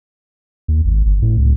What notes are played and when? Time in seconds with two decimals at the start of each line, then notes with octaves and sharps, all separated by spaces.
0.68 D#2
0.85 G#1
1.06 G1
1.22 A2
1.37 C#2